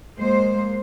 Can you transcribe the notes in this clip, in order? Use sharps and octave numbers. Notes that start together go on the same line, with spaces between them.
G#3 A#3 C5